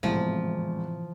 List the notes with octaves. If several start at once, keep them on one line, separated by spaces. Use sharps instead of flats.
G#1 E2 A2 C3 E3 F3